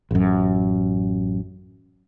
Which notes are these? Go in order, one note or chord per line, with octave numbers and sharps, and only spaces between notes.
A1 F#2